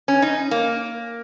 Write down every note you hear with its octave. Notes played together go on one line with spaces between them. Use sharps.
C#4
D#4
A#3